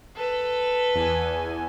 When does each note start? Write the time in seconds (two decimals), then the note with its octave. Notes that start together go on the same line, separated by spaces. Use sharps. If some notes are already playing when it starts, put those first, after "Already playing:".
0.16 A4 B4
0.95 E2 G#5